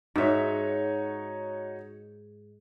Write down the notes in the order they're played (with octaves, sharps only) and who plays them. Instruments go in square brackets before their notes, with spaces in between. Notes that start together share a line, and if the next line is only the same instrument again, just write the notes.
[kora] G#2 E5 [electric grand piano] D#4 F#4 C#5